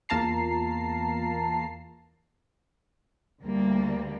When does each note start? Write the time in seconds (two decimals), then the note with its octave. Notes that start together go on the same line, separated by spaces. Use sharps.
0.09 E2 A#3 F4 A5 A#5 C7
3.42 D2 G3 A#3